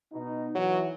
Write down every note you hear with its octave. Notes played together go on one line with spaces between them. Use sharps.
B2 D#4
E3 F#3